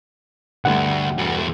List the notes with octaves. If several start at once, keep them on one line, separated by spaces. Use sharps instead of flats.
D2 G2 G3 A3 F#5
E2 F#4